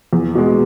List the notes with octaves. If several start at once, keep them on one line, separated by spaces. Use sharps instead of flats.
E2
B2 G#3